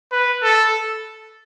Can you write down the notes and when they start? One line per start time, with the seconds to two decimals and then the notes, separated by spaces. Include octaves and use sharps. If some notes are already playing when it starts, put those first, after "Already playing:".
0.12 B4
0.43 A4